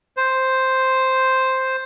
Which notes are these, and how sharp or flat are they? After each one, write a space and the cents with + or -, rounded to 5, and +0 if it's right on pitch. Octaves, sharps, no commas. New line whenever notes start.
C5 +0